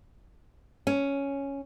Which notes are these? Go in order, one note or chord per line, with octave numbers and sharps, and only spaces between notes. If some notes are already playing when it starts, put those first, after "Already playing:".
C#4